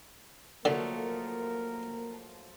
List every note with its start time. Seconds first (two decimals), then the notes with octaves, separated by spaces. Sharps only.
0.65 D3 F3 F#3 A3 A#3 A#4